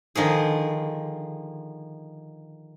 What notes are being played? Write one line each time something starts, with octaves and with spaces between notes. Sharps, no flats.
D3 D#3 F3 G#4